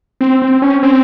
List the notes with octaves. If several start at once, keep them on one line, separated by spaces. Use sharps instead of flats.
C4
C4
C#4
C4